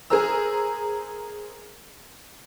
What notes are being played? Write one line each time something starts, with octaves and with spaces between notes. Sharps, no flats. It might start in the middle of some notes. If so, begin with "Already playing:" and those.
G#4 A#4 C5 A#5 E6